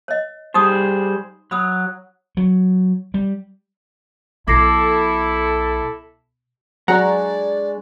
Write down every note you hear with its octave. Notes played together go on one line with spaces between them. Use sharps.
C#5 D#5
G3 D#4 G#4 C5 D#6
F#3 B5 D#6 E6
F#3
G3
B1 E4 A4 D6 A#6 C7
F#3 G#3 D4 D5 F#5 A#5 C#6